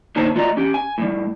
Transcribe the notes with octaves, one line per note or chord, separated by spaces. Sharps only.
A#2 D3 D#4 C5 C#5 A5
A3 F4 F#4 D5 D#5 A#5
C#4 G4
G#5
A2 G3